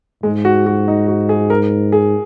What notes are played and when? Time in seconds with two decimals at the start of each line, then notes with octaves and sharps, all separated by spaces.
0.23 G#2 G#3
0.45 F#4
0.66 F#4
0.88 D#4
1.08 F#4
1.29 G#4
1.50 A#4
1.92 G#4